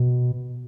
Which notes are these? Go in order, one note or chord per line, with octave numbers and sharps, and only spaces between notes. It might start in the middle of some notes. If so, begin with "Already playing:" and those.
Already playing: B2